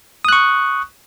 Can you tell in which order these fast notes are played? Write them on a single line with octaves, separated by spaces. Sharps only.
D#6 F#6 C#6